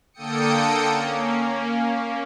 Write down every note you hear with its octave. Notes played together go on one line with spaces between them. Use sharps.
D3 A#3 A4 G5 D#6 C#7
A#3 C#4